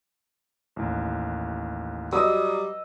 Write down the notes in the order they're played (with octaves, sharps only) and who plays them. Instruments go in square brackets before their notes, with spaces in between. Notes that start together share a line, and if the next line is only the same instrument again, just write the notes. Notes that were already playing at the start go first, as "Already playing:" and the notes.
[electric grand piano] A1 D#2
[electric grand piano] F#3 D#6 [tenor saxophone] G3 [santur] D#5 E6